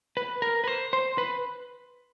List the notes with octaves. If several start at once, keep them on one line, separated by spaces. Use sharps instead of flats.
B4
A#4
B4
C5
C5
B4